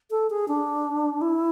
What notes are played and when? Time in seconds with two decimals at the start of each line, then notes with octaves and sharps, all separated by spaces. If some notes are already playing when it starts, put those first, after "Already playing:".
0.11 A4
0.30 G#4
0.48 D4
1.21 E4